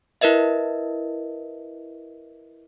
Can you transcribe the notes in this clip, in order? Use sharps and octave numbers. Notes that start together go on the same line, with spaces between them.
E4 A#4 B4 D#5 E5